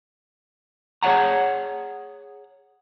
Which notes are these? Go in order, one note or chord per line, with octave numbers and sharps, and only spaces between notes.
G#4 C#5 D5 F#5 A#5